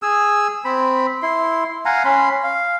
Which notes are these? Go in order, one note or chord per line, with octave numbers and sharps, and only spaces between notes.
G#4 G#5 E6
C4 B5
E4 C6
F5 F#5 G#5 A#5
C#4 B5 C6
F5